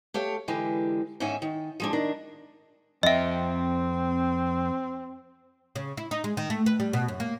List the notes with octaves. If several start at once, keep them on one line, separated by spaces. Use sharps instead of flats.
A3 G4 C#5 F5
D3 E3 G#3 G4 B4
G#2 D#3 C#4 C#5 E5 G#5
D#3
F3 G#3 D4
D#3 D4 A#4
F2 C4 D#5 E5 G5
C#3
E4
D#4
G#3
D#3
A3
B4
G3
B2
F#2
A#3